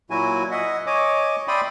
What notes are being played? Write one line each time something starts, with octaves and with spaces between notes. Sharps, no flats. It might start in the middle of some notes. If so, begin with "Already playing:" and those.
A#2 F#3 E4 F#4 G#5
D#5 E5 F#5
C#5 D#5 G#5 D6
D5 E5 G5 B5 C6 D#6